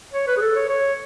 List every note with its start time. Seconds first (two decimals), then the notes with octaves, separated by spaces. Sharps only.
0.13 C#5
0.27 B4
0.37 G#4
0.42 A4
0.56 C#5
0.69 C#5